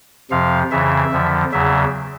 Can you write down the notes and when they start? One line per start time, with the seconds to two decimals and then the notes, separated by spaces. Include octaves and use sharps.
0.31 F2 C3 F3 F5
0.71 F2 C#3 E3 E5
1.12 F2 D3 F3
1.52 E2 C#3 F#3 E5